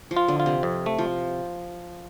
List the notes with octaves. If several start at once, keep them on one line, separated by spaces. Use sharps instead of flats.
F3
F4
D3
F4
C3
F2
A3
F3